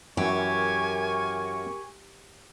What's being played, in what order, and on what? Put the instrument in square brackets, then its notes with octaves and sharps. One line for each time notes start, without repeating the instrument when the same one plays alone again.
[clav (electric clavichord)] F#2 E3 [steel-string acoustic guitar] G4 [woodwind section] A#4 C#6 [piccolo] G#5